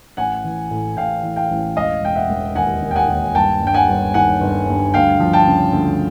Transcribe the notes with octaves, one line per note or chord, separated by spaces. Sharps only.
A1 F#5 G#5
E3
A2
A2 F5 G5
E3
F5 G5
A1
E1 D#5 F5
E1 G5
E5 F#5
E1
D#2 F#5 G#5
D#2
G5
F#5 G#5
D#2
G1 G5 A5
G2 G5
F#5 G#5
G1
D#3 F#5 G#5
G1
G2
D2 F5 G5
F3
G5 A5
C#3
D2